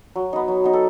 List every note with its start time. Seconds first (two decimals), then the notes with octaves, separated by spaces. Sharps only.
0.16 F#3
0.33 B3 D#4
0.48 F#3
0.64 B3 D#4
0.73 A4